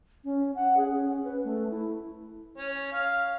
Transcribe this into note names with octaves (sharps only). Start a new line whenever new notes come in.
C#4
F#5
G#4
C#4
B4
A3
E4
C#4
F5